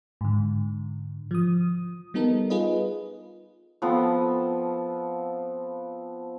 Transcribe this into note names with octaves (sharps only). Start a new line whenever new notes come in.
G#2 D3
F3 D#6
G3 B3 D#4 A4 A#4
F4 G#4 B4 D#5
F3 B3 C4 A4